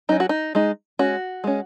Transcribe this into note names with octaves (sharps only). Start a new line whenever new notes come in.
F#3 C#4 D#4
F#4
D#4
G#3 D#4
G#3 C#4 F#4
G#3 C#4